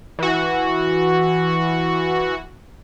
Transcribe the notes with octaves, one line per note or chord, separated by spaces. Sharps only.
E3 F#4